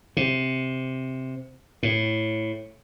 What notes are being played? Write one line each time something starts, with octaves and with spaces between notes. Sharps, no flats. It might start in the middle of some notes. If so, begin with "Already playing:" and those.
C3
A2